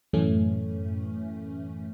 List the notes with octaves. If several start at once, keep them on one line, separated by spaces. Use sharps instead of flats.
F#2 A2 E3 A3 C#4